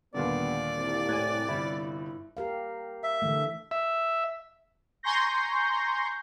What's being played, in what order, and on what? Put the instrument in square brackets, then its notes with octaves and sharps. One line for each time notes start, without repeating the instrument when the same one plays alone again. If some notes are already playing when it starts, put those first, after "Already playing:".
[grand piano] D#2 A#2 D3 [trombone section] G3 B3 [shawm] D5
[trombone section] C2
[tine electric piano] A2 G#5 [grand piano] F#6 G#6
[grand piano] G1 C3 G3 [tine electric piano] E4
[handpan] G4 A#4 F5
[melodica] E5
[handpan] D3 E3 A3
[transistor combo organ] E5
[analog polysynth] G#5 A#5 C6 C#6 G6 A#6